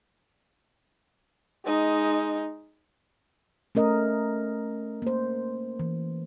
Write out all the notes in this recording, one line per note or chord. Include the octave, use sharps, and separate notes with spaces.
G#3 D#4
A3 C#4 A#4 D#5
A#3 C5
E3